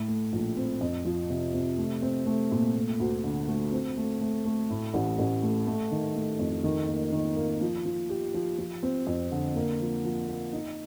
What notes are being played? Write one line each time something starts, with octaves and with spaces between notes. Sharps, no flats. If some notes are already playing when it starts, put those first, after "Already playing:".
Already playing: A2
A3
A#1
C4
F2
F3
C3
C3
A3
C4
A3
A#2
A3
D2
D3
A3
C4
A3
A3
A3
A2
A1
A1
A3
A3
D#3
A3
F2
D#3
A#3
D#3
A#3
F3
F3
G4
F3
F3
C4
F2
D3
A#3
F3
F3
A#3
D#4